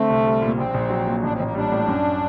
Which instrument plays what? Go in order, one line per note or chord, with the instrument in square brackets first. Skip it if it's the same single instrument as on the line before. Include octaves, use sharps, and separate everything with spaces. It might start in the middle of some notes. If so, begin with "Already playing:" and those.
Already playing: [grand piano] D3 C4 [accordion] A3
[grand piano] C2
G3
A#2
[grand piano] A#1 [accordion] C4
[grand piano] A#1
F#3
A#2
[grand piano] A1 [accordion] D4
[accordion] C4
[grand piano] A1 [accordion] A#3
[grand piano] G3 [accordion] D4
[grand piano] A2
F#2